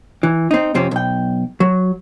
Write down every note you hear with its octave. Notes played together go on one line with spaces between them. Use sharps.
E3
C4 D#4
F2 C3 C4 C#4
B1 G5
F#3